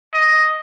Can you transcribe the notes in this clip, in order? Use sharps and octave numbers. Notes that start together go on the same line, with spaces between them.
D#5